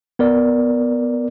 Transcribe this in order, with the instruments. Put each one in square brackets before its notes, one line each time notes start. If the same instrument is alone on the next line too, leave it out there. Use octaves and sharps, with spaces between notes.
[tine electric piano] B3 A#4 D5